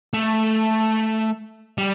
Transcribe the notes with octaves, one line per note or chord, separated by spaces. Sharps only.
A3
G3